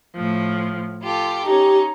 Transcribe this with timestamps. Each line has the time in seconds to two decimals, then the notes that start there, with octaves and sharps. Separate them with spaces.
0.15 A2 F3
1.02 F4 G4 A4
1.46 C#4 D#4 G4